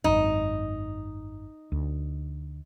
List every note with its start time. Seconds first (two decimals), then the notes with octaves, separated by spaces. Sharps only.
0.04 G#1 F#2 D#4
1.72 D2